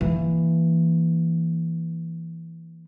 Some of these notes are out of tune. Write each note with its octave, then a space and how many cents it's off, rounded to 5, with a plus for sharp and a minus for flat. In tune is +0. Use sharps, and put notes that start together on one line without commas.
E3 +10 A#3 +0